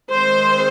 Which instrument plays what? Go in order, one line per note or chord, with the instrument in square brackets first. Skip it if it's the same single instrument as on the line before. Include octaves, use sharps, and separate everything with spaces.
[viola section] D#3 G#3 C4 C5